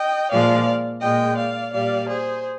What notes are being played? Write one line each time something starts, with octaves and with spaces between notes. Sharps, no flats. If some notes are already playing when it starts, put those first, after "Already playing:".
Already playing: D#5 G5
A#2 F3 G#3 D5 F5
A#2 G#3 D#5 G5
D5 F5
A#2 G3 D5 F5
G#4 C5